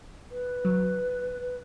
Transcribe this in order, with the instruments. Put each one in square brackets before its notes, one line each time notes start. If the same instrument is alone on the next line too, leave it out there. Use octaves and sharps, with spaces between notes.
[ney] B4
[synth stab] F#3